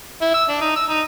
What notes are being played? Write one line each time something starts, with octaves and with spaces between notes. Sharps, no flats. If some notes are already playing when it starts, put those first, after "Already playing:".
E4
E6
D4
D#4
E6
D#4